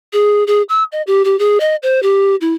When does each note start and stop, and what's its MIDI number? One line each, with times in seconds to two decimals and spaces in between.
0.13 0.44 68
0.47 0.62 68
0.69 0.84 88
0.92 1.02 75
1.07 1.22 67
1.25 1.38 67
1.39 1.58 68
1.60 1.76 75
1.83 2.00 72
2.03 2.36 67
2.41 2.54 64